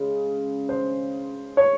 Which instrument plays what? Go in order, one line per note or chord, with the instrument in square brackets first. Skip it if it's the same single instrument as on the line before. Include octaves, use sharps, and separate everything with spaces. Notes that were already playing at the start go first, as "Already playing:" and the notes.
Already playing: [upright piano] C#3 G#3
C5
C#5